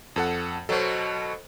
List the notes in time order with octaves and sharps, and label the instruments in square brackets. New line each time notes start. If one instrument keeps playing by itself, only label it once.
[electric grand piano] F2 A4 F#5
[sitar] B2 F#3 [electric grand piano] A4 C5